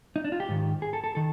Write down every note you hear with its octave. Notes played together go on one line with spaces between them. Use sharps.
D#4
D4
F4
G4
G#2 D#3
G#4
A4
A4
D#3 A4